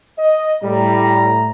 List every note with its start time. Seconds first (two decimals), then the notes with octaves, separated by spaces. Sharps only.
0.19 D#5
0.63 A2 G3 A#5